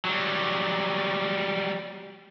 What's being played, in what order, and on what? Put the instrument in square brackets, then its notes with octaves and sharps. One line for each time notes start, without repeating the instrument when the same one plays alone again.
[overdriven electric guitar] F#3 G3